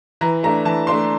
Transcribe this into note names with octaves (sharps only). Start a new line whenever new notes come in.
E3 A#5
A3 D4 A#5
E3 A5
A3 D4 C6